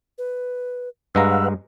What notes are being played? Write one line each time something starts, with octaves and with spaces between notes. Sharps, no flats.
B4
G2 G#3 B4 F5 F#5 A#5 E6